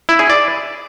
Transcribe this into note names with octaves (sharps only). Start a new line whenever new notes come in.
E4
G#4
D5